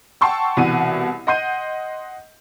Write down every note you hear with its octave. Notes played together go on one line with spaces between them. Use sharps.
F#5 G5 A5 C6 C#6 E6
C2 B2 E3 F#5 D#7
D#5 F#5 C6 G6 D#7